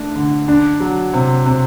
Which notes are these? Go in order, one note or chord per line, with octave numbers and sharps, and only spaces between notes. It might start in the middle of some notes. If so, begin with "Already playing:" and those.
Already playing: A3 D4
D3
D4
F#3
C3
C3